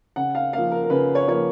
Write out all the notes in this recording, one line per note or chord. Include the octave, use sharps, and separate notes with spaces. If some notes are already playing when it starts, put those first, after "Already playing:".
C#3 F#5
F5
F3 A#3 F5
A#4
A#4
C#3 B4
C#5
F3 A#3 C#5